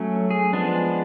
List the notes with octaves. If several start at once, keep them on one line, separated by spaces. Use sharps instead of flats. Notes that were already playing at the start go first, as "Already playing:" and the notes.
Already playing: F#3 A3 C#4
G#4
F3 G#3 B3 D4